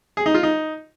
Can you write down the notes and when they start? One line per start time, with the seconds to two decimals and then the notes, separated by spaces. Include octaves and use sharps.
0.17 G#4
0.26 D#4
0.35 F4
0.43 D#4